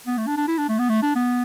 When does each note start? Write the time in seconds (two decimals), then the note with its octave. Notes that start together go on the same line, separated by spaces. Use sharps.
0.07 B3
0.18 A3
0.27 D4
0.37 D4
0.48 E4
0.58 D4
0.69 A3
0.79 B3
0.89 A3
1.03 D4
1.16 B3